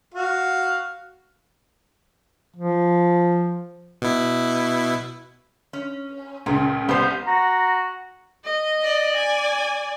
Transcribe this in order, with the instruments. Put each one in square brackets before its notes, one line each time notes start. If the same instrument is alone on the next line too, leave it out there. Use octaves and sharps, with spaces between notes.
[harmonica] F#4 F5
[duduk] F3
[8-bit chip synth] B2 E4
[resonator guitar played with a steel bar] C#4
[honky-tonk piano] C#2 C#3 [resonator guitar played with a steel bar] A#2
[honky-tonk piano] C2 G6 [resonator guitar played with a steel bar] B3 C5
[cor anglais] F#4 [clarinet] A#5
[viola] D#5
[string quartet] D5
[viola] G#5